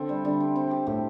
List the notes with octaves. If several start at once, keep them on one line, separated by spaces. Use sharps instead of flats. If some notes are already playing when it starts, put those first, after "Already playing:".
Already playing: D3 C4 A4 E5
G3
D3 G3
G4
C4
G4
A2 G4